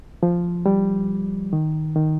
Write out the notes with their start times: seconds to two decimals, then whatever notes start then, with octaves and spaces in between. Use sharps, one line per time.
0.23 F3
0.66 G3
1.53 D#3
1.96 D#3